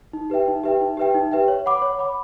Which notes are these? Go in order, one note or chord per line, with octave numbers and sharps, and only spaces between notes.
D#4
G4 B4 E5 G5
D#4
G4 B4 E5 G5
D#4
G4 B4 E5 G5
D#4
G4 B4 E5 G5
C#5
F#5 B5 D6
C#5
F#5 B5 D6